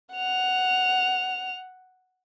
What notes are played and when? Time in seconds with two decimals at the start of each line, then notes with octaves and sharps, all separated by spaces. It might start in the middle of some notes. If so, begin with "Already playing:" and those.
0.14 F#5 F7